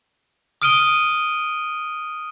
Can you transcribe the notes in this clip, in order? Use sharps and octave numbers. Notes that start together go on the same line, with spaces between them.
D#6 F6 D7 D#7 G7